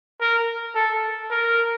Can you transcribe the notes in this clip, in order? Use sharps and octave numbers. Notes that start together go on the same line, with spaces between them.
A#4
A4
A#4